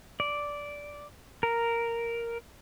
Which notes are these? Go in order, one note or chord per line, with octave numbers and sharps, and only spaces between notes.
D5
A#4